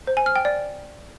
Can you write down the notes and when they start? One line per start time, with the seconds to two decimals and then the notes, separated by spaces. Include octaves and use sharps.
0.07 C5
0.17 G#5
0.26 F6
0.36 G5
0.45 D5